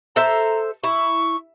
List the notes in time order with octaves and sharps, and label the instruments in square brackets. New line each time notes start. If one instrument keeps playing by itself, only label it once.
[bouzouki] A4 C5 E5 [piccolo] A#5
[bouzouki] E4 [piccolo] C#6